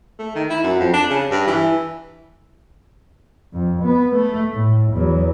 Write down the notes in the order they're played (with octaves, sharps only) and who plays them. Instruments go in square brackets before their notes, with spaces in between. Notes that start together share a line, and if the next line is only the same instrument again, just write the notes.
[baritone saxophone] A3
D#3
E4
F#2
F2
D4
C#3
G2
E3
[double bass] F2
B3
A3
A2
E2 F#3